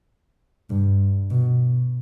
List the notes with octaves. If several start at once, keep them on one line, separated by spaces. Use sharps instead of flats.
G2
B2